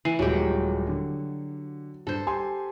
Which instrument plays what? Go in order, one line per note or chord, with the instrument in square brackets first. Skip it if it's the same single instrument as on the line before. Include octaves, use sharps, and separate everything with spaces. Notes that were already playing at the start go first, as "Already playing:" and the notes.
[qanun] E3 [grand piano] C7 D#7
[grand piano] D#1 G#3 [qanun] F#3 G4
[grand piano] D3
[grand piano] G2 [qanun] A4 C5
[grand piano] G4 G#5 C6